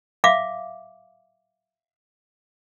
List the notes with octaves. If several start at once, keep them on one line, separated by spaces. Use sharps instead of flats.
E5 F5 D6